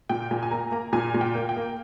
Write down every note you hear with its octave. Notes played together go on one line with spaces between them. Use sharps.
A#2 G5
A#2 G#5
G#5
A#3 A#5
A#3 A#5
A#2 G#5
A#2
G5
A#3
G5
A#3